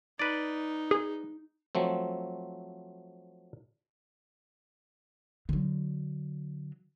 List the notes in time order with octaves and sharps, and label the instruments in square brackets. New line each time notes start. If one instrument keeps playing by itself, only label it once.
[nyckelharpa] D#4 [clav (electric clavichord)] B4 D5
[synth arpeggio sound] G#4
[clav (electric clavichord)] F3 F#3 A3 C4
[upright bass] D3 F#3